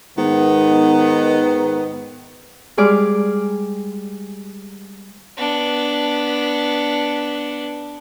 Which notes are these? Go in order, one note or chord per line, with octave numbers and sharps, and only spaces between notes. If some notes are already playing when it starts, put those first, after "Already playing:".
G#2 D#3 B3
G3 G#3 G#4 D5 D6 F6
B3 D4